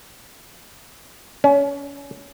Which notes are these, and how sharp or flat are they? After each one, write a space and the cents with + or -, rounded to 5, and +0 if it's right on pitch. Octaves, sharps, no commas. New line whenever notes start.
C#4 +30